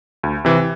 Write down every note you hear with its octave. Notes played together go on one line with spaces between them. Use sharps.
D2
C3 E3